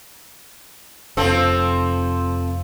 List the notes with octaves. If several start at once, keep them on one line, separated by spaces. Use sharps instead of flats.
F1 F3 C4 A4